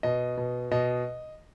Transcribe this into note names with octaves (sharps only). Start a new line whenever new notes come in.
B2 D#5
B2
B2 D#5